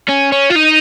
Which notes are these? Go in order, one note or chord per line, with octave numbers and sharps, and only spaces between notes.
C#4
C#4
F4
D#4